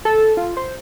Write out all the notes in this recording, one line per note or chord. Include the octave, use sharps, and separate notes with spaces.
A4
F4
C5